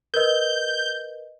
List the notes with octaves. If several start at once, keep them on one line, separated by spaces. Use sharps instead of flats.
A#4 B4 D#5 G6